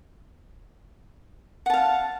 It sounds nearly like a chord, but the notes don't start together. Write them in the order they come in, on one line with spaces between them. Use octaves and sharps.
F#5 A5 F5